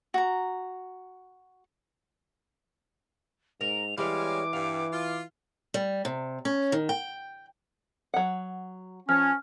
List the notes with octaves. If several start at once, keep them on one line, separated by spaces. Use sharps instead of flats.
F#4 A#5
G#2 A#4 F7
E3 G3 G#3 C#5 F5 D6
G2 F5
F4
G3
C3
C#4
D#3
G5
F#3 F#5
F3 C#4 F6